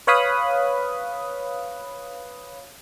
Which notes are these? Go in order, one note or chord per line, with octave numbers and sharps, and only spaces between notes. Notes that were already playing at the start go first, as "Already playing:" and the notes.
B4 C#5 F5 B5 D#6 F#6